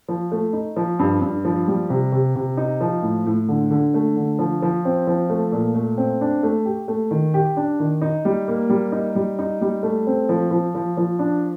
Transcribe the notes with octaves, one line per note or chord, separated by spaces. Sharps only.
F3
A3
D#4
F3
G2
G2
F3
G3
C3
C3
C3
D#4
F3
A2
A2
D3
D3
A3
D3
F3
F3
C4
F3
A3
A#2
A3
C4
D4
A3
G4
A3
D#3
G4
D4
D#3
D#4
G3
A#3
G3
D#4
G3
D#4
G3
A3
C4
F3
F3
F3
F3
D4